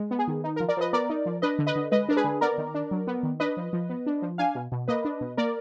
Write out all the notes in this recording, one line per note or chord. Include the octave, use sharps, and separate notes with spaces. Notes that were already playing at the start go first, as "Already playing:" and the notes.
Already playing: G#3
B3
G#4
D#3
D#4
A#4
F3
A#4 D5
F3 B4 D#5
B3 A#4 D5
D#4
F3
D4 B4 D#5
D3
B4 D#5
D3
G#3 B4 D#5
D4 A#4
G#4 B4
D3
B3 A#4 D5
D#3
D4
F#3
B3
D#3
D4 B4 D#5
F3
F3
B3
D4
F3
D4 F5 G#5
B2
B2
A#3 B4 D#5
D4
B2
A#3 A#4 D5